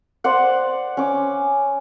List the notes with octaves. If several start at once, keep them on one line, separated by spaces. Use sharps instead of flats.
C5 D5 F#5
C#4 D6